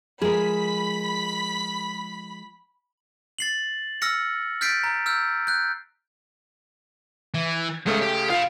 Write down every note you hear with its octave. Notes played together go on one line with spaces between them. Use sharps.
F3 G#3 G#4 A#4 B5 B6
A6 C7 F#7
E6 F6 A#6 C#7
F6 G6 A6 B6 C7 D7
A#5
E6 F6 G6
F#6 G6
E3
C#2 C#3 G#3 A3 C#5
G4
F4 F5 B5